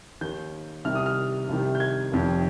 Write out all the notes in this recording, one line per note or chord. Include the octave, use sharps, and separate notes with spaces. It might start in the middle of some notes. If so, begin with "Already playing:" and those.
D#2 D#3 G6
C2 C3 D#3 F6
D#6
F6
C2 C3 D#3
G6
G#6
F1 F2 D#3